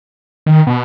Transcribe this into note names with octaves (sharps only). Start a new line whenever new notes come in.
D#3
B2